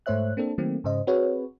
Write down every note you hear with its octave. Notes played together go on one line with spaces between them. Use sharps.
G#2 A3 C5 C#5 E5 F#6
A#3 C4 D4 A4
D#3 F#3 A3 A#3 C4
G#2 C#3 C5 D#5
C4 F#4 G#4 B4 C#5